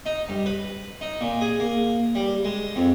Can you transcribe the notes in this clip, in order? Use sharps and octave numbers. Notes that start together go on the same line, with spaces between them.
D#4
G2
B4
D#4
A#2
G#4
A#3
G3
G#3
F2